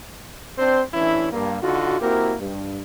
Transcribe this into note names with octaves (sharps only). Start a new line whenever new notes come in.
C4 D4 C5
A1 E3 C#4 D4 E4
G2 A#3
D3 D#4 F4 F#4
A#3 C4 E4 F#4 G4 A#4
G2